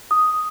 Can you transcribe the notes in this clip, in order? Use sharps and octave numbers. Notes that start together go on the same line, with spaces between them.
D#6